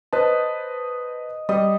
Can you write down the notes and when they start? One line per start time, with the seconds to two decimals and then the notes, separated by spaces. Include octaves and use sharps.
0.13 B4 C5 D#5 A5
1.49 G3 D#5